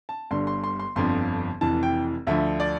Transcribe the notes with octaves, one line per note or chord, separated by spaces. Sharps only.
A5
G1 G2 D3 C6
C6
C6
C6
G1 F2 D3 F3 C6
F1 F2 E3 A5
G5
D2 D3 F3 E5
D5